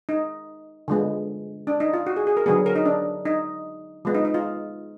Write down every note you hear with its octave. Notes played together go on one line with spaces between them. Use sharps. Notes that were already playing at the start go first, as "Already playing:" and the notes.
D#4
D3 F3 G#3 B3
D4
D#4
F4
F#4
G#4
G#4
A#4
D3 F#3 B3 G#4
A#4
D#4
D4
D#4
F3 G#3 B3
D#4
D#4
F4